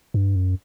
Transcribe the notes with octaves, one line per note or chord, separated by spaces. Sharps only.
G2
F#2